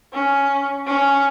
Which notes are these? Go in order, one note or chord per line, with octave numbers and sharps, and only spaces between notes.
C#4
C#4